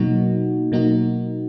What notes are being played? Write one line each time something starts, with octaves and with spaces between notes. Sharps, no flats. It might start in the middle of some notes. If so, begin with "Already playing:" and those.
Already playing: B2 F#3 A#3 D#4 F#4
B2 F#3 A#3 D#4 F#4